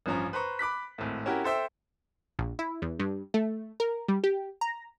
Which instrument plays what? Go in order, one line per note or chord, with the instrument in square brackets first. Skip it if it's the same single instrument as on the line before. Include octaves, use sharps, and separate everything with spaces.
[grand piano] A1 G2 F3 C#4 A#5
B4 C5 A#5 C#6
B5 D6 F#6 B6
G#1 A2
C#4 E4 F#4 G4 A#4
A4 C5 E5 G5
[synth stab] A#1
E4
E2
G2
A3
A#4
G3
G4
A#5